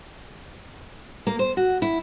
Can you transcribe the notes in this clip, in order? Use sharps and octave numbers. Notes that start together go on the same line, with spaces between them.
A#3
C5
F#4
E4